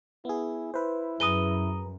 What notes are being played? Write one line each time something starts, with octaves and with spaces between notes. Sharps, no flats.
B3 E4 G#4
E4 B4 C5
F#2 G#4 B4 A#5 D#6 D#7 G7